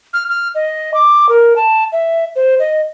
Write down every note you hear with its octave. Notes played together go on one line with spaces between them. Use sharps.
F6
F6
D#5
D6
A#4
A5
E5
C5
D#5